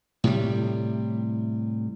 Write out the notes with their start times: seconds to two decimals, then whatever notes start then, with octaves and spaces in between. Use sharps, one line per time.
0.24 A2 C3 G3